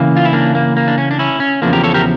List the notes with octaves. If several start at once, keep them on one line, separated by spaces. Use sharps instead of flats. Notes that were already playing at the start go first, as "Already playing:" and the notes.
Already playing: C#3 E3 A#3
F4
E4
A#3 D4
A#3
A#3
D4
C#4
D4
C#4 E4
C#4
E2 C#3 F3 A#3 D4
G4 A#4
A4 C#5
G4 A#4